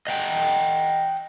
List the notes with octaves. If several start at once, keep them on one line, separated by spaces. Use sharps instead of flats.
D#5 F#5 G5